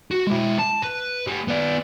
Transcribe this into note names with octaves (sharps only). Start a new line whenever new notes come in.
F#4
G#3 E4
A5
B4
A3 G4
B3 D5